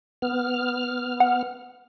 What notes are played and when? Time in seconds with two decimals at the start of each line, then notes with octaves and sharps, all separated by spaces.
0.22 B3 F6
1.20 F#5